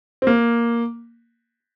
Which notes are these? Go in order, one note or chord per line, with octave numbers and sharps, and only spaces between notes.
C4
A#3